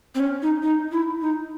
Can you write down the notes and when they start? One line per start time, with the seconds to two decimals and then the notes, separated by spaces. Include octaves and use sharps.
0.15 C4
0.20 C#4
0.42 D#4
0.63 D#4
0.92 E4
1.21 D#4